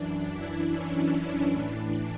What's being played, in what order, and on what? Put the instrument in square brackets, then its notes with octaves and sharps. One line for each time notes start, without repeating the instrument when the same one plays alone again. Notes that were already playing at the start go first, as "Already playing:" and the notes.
Already playing: [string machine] F#2 E3 D4
E4
C#4
A2 E3 D4